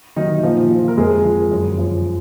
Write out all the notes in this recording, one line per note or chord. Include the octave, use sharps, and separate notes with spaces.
D#3 F#3 D#4
D#4
A#2 F3 F4
F3
A#4
F2 G#3 G#4
F3
F#2
F3